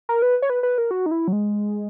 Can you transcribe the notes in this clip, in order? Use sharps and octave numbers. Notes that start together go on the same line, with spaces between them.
A#4
B4
C#5
B4
B4
A#4
F#4
D#4
E4
F#3
G#3